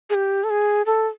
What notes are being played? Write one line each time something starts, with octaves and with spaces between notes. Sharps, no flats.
G#4
G4
A4
G#4
A4